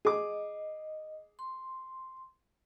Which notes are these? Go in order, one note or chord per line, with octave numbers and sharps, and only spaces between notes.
G#4 D#5 D6
C6